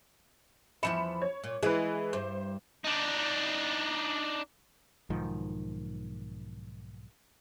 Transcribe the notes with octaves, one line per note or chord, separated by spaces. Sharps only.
E2 F3 E5 B5 C#7 E7
C#5
A#2
E3 G#3 G#4 B4
G2 C5
D4 D#4
B1 G#2 D#3 F3